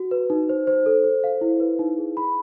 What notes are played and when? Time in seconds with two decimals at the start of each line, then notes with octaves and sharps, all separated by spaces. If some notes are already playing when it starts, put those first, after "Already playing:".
Already playing: F#4
0.11 B4
0.30 D#4
0.49 C5
0.67 C5
0.86 A4
1.04 C5
1.24 F5
1.41 E4
1.60 B4
1.79 D#4
1.97 G#4
2.17 B5